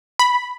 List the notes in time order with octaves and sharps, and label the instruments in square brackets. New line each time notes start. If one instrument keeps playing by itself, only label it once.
[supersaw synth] B5